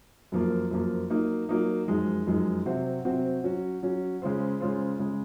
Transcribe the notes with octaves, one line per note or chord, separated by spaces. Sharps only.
F#2 F3 A#3
F#2 F3 A#3
F#3 A#3 D#4
F#3 A#3 D#4
F#2 F3 G#3 D#4
F#2 F3 G#3 D#4
C3 F#3 C4 F#4 C5
C3 F#3 C4 F#4 C5
F#3 C#4 F#4
F#3 C#4 F#4
C#3 G#3 C#4 F4 C5
C#3 G#3 C#4 F4 C5
C#3 G#3